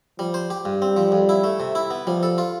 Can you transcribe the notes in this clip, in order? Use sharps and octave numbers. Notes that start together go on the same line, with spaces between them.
F3 G3
C5
G4
G2 G3
C4
F3
F2
E4
A3
C3
E4
B3
F3 G3
A4
F4